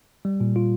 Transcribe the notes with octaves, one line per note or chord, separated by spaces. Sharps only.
G3
A#2
F4